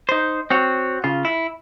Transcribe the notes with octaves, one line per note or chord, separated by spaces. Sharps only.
D#4 C5
C4 F#4 C#5
C#3 F4
E4